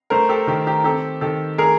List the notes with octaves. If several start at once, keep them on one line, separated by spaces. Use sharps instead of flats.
A3 A#4 C5
G4 A4
D#3 G4
G4
C4 G4 A4
D#3 G4 A4
A3 G#4 A#4